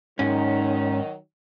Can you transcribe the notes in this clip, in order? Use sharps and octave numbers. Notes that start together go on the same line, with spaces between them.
G#2 D#3 F#3 C#4 D#4